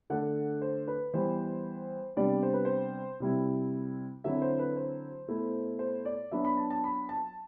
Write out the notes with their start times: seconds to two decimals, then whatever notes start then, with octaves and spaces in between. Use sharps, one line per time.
0.10 D3 A3 D4 F#5
0.62 C5
0.88 B4
1.13 E3 G3 B3 C5
2.16 C3 G3 B3 D4 D5
2.43 C5
2.54 B4
2.65 C5
3.20 C3 G3 C4 E4
4.24 D3 F#3 C4 E4 E5
4.42 C5
4.59 B4
4.76 C5
5.28 B2 A3 E4
5.79 C5
6.05 D5
6.31 F#3 B3 D4 E5
6.45 B5
6.57 A5
6.70 A5
6.84 B5
7.09 A5